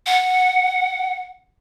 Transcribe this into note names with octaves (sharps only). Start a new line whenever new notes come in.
F#5